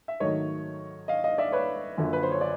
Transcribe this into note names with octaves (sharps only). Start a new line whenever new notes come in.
E5
G#2 D#3 F#3 A3 C#5 D#5
D#5 F5
D#5 F5
D5 E5
B4 C#5
F#2 D3 F3 A#3
B4
C5
C#5
D5